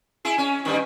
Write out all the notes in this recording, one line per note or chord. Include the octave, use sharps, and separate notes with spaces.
E4 G#4
C#4
G2 D#3 G3